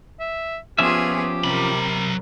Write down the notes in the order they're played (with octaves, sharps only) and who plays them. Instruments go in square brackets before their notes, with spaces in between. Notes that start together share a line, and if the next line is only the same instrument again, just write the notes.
[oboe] E5
[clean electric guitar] F3 C#4 E5 [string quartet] B3 F4 G#4 [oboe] G4
[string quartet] C3 A#4 [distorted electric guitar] F#3 B5